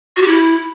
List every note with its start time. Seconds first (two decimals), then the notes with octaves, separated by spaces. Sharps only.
0.16 F#4
0.22 G4
0.28 E4